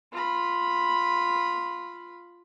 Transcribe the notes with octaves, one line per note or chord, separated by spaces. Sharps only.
F4 B5